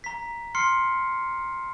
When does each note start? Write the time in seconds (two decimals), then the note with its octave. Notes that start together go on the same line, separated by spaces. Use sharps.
0.04 A#5 B6
0.55 C6 F6 C7 C#7